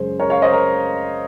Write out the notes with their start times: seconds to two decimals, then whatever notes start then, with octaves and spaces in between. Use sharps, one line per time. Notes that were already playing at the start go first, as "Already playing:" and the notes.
Already playing: F#2 C#3 G#3 C5
0.20 A#4 C#5
0.30 C#5 F5
0.42 C5 D#5
0.53 A#4